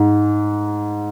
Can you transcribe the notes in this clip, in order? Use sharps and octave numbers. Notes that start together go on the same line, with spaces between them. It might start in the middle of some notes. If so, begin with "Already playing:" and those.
Already playing: G#2